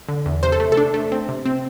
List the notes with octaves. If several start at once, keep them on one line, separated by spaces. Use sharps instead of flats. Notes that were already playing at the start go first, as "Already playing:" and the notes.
D3
E2
C3 C5
A4
A3
A4
D4
A3
C4
C3
C4